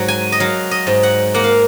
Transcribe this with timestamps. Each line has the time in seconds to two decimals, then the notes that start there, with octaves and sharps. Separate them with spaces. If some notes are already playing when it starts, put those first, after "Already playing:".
Already playing: G#2 F#3
0.08 G#5
0.32 D#5
0.40 F#3 F5
0.71 D#5
0.87 G#2
1.03 F#5
1.34 A#3 F#5
1.44 F5